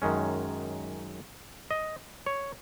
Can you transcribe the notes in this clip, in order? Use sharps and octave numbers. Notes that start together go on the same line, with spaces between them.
F#2 D#3 G#3 C#4
D#5
C#5